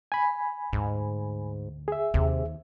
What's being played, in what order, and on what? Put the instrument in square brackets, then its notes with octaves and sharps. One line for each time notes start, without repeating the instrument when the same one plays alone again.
[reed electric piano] G#5 B5
[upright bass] D2 [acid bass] G#2
[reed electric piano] G#4 E5
[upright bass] D#2 [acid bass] C3